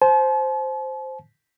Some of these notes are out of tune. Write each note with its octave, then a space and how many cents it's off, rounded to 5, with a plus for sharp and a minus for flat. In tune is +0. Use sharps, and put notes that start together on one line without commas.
C5 +0 A5 -45